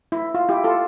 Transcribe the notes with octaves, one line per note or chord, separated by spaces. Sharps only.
E4
F4
E4 G4
F4 A4